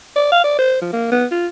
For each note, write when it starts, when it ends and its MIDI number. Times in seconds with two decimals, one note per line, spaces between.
0.16 0.27 74
0.32 0.43 77
0.44 0.54 74
0.59 0.79 72
0.82 0.88 53
0.93 1.09 58
1.12 1.26 59
1.31 1.47 65